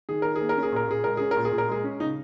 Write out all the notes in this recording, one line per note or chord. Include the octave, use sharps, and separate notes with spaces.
D#3 G#4
D#3 A#4
G#4
A#3
A#4
C#4
G#4
A#2 A#4
A#2 G#4
G#3 A#4
C#4 G#4
A#4
A#2
G#4
A#2
A#4
G#3 G#4
C#4
C#3 D#4